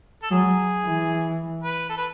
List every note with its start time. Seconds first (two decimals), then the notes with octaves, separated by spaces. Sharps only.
0.22 A4
0.31 F#3 G#4
0.84 E3
1.63 B4
1.89 A4
1.97 B4